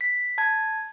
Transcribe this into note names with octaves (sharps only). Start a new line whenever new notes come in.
B6
A5 G#6